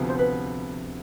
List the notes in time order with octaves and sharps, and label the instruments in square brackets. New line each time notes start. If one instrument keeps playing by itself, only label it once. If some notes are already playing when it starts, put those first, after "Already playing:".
Already playing: [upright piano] D2 C3 F3 B3
[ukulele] C5
B4